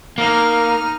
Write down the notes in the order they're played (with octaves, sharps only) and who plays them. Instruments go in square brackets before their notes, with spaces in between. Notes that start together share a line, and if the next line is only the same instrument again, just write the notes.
[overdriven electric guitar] A#3 [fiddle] D#4 F6